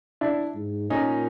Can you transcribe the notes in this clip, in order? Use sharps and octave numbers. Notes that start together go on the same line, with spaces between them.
D4 E4
G#2
A#2 C#4 D#4